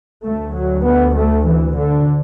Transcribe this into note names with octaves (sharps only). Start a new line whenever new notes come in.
D2 A3
F#3
B3
A3
E3
D3